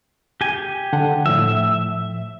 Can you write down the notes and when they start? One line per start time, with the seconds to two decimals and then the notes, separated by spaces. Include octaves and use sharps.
0.41 G4 G#5
0.93 D3 F#5 A5
1.26 A2 F3 E5